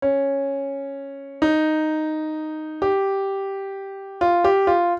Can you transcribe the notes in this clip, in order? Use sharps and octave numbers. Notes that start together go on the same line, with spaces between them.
C#4
D#4
G4
F4
G4
F4